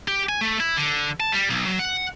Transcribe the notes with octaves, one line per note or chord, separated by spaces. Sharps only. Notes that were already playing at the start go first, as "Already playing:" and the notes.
G4
G#5
A3
E4
D3
A5
G3
B1
F#3
F#5